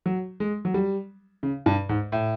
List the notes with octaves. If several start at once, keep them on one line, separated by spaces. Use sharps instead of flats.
F#3
G#3
F#3
G3
C#3
G2
G#2
A2